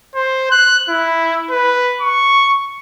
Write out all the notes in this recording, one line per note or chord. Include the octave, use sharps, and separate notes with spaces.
C5
F#6
E4
B4
C#6